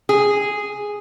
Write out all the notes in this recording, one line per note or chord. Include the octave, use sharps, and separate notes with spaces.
G#4